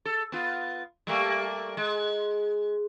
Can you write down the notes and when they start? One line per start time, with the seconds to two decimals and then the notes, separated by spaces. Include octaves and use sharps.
0.05 A4
0.32 B3 F4
1.07 G3 A3 A#3
1.77 G#3